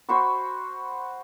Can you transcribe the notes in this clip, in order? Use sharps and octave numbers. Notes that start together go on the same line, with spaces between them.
F#4 C5 B5 C#6